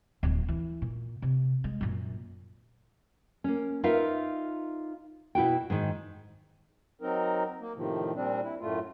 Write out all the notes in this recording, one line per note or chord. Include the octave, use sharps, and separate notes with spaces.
D1 F#3
E3
A#2
C3
G#3
F#2 A#2
A#3 C#4
D#4 F4 A#4 B4 E5 F5
B2 E4 F#4 G5
G#2 D#3
F#3 C4 D#4 A#4
A#3
A2 C3 D#3 F3
A#2 G3 C4 D4
E4
F#2 A2 A3 F4